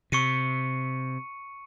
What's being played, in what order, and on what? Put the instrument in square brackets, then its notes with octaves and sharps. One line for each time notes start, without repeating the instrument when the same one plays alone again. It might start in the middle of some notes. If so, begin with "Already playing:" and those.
[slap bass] C3 [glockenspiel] C#6 C#7 D#7